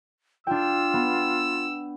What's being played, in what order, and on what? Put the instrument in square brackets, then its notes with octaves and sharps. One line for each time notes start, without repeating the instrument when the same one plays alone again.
[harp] D4 G5 [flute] F4 [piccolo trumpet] E6
[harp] B3